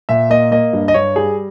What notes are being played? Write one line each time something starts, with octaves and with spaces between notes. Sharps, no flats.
A#2 E5
A#3 D#5
A#3 D#5
G2
D#5
G2 C#5
G3 G#4